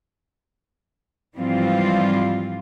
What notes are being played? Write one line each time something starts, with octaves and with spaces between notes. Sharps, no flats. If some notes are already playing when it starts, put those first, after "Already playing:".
G#2 E3 F3 G3 C4 F4